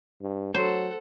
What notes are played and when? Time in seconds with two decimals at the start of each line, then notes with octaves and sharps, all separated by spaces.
0.22 G2
0.54 F#3 A4 C5 F#5